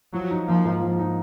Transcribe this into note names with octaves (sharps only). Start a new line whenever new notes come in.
F3 F#3
D#4
F3 A#3
G#2
F3
D#4